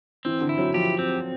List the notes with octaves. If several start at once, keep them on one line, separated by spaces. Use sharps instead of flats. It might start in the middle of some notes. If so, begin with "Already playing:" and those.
E3 C4
D3
E4
F#3
F3 G4
C4